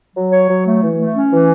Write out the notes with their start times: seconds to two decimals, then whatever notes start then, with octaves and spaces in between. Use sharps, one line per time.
0.15 F#3
0.31 C#5
0.48 F#3
0.66 A3
0.82 E3
0.98 A3
1.15 C#4
1.31 E3